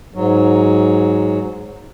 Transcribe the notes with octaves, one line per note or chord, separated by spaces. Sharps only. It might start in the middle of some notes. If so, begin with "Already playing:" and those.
G#2 F#3